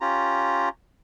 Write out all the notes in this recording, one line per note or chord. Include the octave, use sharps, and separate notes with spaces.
C#4 F4 G4 A#5